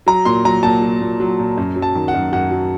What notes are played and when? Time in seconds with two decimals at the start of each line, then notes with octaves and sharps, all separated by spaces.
0.06 F#3 A#5
0.25 A#2 C6
0.45 F#3 A#5
0.63 A#2 A5
0.82 F#3
1.01 A#2
1.20 F#3
1.39 A#2
1.57 F#2
1.76 F#3
1.82 A5
1.95 D#3
2.08 F#5
2.14 F#2
2.33 F#2 F#5
2.51 F#3